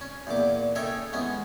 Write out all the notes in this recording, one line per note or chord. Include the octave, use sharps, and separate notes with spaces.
C#4
E2 A#2 D6
C#4 D#4 A4 C#5 E5 G5
E3 G#3 B3 C#4